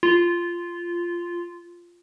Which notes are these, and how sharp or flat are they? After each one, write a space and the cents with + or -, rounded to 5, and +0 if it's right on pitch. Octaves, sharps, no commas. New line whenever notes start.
F4 -10